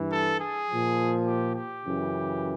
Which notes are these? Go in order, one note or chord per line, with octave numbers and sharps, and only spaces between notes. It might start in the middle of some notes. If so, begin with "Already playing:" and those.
Already playing: G2 E3
A4
G#4
A#2 F3
G4
G4
F#2 C#3 E3